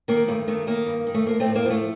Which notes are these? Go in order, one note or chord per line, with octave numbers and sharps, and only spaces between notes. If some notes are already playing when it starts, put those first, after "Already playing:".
D#3 A#3
G2 A3
D#3 A3
D#3 A#3
G2
D#3
A3
F3 A#3
A3 C4
A2
A#3
F3 A3